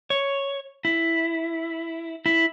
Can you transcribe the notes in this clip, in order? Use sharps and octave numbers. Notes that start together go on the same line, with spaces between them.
C#5
E4
E4